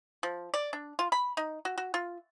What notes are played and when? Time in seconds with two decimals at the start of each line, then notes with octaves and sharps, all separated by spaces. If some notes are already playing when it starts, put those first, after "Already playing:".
0.23 F3
0.54 D5
0.73 D4
0.99 F4
1.12 B5
1.37 D#4
1.65 F#4
1.78 F#4
1.94 F4